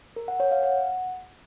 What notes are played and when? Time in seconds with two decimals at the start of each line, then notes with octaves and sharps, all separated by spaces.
0.16 A#4
0.28 F#5
0.40 C#5
0.51 F5
0.63 F#5